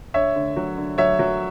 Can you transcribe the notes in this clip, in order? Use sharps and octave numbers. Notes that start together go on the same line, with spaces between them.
D3 C#5 E5
D3
F#3
D3
F#3 C#5 E5
F#3